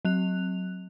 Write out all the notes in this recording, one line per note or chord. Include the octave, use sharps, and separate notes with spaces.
F#3 C4 F#6 F7